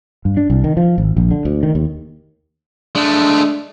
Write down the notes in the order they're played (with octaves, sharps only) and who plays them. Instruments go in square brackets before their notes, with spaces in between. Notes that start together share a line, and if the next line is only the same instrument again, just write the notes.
[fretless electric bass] G2
D4
C2
D#3
F3
G#1
A#1
D3
D2
D#3
D#2
[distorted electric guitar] G#3 A3 [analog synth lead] D4